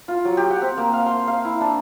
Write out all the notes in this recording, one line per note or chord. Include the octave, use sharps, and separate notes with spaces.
F4
F#3
G4
F#5
C4
A#3
F5
C6
F5
E4
D4